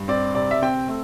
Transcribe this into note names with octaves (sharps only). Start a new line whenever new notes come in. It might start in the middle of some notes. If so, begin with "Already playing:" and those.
Already playing: G2
C4 D5
C3 D5
E5
C4 G5
A3